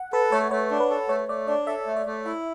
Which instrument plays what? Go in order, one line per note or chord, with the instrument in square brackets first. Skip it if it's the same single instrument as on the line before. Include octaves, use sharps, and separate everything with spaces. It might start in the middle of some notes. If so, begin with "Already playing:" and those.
Already playing: [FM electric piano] F#5
[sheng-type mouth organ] A4 [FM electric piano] B4
[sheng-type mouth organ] A3 [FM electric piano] C#5
[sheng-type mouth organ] A3 [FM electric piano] C#5
[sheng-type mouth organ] D4
[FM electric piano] B4
[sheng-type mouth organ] A4
[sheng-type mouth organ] A3 [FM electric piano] C#5
[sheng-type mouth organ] A3 [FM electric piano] D5
[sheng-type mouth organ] D4 [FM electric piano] D5
[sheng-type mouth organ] A4 [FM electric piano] E5
[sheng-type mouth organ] A3
[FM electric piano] D5
[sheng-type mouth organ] A3
[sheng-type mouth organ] E4 [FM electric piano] E5